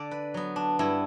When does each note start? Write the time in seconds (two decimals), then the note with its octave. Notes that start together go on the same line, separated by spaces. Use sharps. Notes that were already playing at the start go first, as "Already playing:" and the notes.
Already playing: D3 D5
0.11 B4
0.34 F#3 B3
0.56 D4
0.79 G2 E4